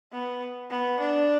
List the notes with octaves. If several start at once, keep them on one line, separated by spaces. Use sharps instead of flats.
B3
B3
D4